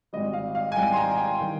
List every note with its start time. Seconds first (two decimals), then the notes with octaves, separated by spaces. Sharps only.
0.13 G#1 G#2 G3 D#5
0.33 F5
0.55 F5
0.72 G#5
0.76 G#1 G#2 G3 G5
0.92 C6
0.97 A#5
1.18 G5
1.40 D#3 G3